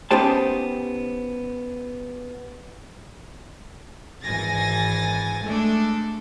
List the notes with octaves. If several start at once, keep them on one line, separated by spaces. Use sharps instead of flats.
B3 C#4 D#4 G4 C5 A5
G#1 E3 G#5 A6 A#6
G#3 A3 D4 A4